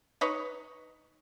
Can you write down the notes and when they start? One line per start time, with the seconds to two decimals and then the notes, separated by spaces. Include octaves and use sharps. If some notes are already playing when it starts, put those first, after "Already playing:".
0.21 D#4 B4 C#5